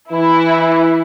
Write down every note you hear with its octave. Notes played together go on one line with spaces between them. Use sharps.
E3 E4